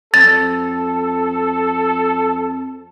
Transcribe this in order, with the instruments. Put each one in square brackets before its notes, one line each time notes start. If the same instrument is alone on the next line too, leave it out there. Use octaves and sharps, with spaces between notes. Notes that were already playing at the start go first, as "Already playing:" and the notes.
[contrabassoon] F2 [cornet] A4 [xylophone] A6